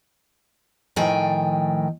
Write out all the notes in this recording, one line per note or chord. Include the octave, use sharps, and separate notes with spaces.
A2 D#3 F3 G5 G#5